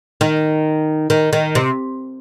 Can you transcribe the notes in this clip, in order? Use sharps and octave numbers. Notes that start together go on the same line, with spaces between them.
D#3
D#3
D#3
C3